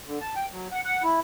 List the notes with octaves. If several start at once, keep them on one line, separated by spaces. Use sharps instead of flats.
D3
A5
G5
F#3
F#5
F#5
E4